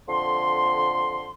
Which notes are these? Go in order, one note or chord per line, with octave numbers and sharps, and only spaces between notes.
F2 D3 C6